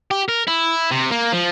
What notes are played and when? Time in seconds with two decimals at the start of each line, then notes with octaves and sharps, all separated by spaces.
0.11 G4
0.28 A#4
0.47 E4
0.91 C3
1.11 A#3
1.33 F3